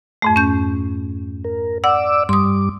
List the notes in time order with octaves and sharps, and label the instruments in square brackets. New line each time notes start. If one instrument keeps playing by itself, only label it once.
[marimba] F2 G#2 A3
C#4 G6
[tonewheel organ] A#4
[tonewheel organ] D5 D6 E6 [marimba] F#5
[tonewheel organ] G2 G3 D6 [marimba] C6 D#6